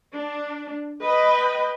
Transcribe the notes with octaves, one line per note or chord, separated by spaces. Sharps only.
D4
B4 D#5 G5 B5